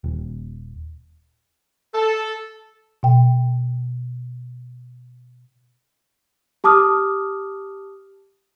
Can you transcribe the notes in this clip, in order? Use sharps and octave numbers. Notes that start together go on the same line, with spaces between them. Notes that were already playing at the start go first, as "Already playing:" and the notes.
D#1
A4
B2 G5
G4 A5 D6 D#6 F6